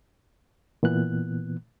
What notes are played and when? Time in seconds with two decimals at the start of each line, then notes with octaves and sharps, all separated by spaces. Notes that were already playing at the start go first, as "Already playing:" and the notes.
0.83 A#2 E3 B3 F#6